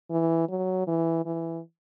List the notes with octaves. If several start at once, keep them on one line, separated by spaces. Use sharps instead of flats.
E3
F#3
E3
E3